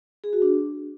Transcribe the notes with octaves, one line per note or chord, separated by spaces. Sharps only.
G#4
F#4
D4